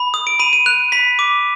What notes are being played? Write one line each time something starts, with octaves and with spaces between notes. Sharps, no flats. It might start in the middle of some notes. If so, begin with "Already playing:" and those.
Already playing: B5
D#6
D7
B5 D#7
D#7
F#6 F7
B5 B6
D6